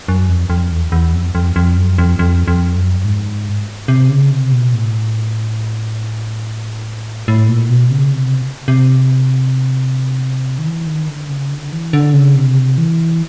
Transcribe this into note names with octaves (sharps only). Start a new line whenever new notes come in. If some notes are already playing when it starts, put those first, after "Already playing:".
F#2
F2
F2
E2
E2
F2
F2
F2
F#2
F2
F2
F2
F#2
G#2
C3
C#3
C3
B2
A2
A2
A#2
B2
C#3
C3
C3
D#3
E3
D#3
D3
C#3
D3
E3
D3
C#3
C3
E3